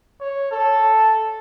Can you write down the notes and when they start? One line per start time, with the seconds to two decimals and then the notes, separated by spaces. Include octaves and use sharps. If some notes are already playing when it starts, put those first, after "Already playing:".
0.20 C#5
0.52 A4